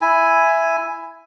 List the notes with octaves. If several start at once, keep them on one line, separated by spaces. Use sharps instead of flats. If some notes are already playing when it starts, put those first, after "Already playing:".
E4 G#5